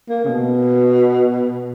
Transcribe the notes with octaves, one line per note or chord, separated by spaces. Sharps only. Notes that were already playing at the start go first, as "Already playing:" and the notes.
A#3
C#3
B2